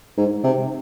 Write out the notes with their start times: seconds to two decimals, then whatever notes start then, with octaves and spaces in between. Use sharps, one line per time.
0.17 G#2
0.44 C3